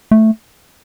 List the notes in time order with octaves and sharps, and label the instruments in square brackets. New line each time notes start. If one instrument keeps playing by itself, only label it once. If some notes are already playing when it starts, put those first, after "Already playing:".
[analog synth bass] A3